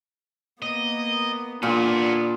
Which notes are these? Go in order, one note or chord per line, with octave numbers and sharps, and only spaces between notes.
A#3 B3 D#5
A#2 B3 D4 F4 G#4